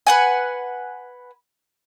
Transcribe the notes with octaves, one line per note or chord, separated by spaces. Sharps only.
B4 F#5 G#5